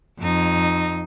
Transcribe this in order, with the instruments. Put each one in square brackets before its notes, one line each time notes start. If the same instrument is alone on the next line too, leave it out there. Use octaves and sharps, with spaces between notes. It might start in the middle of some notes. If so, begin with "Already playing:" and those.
[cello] F2 D#4